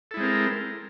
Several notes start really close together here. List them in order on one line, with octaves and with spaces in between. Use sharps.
A4 E4 G#3 C4 A#4